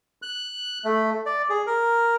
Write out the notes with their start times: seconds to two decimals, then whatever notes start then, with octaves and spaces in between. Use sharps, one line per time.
0.22 F#6
0.84 A3
1.26 D5
1.50 G#4
1.67 A#4